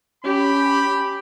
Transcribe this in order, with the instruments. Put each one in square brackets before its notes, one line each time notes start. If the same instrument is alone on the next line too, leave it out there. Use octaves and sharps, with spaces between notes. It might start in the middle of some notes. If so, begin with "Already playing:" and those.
[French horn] C#4 [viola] G4 [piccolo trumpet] B5